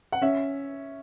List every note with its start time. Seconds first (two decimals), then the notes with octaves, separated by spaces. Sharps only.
0.12 F#5
0.22 C#4 E5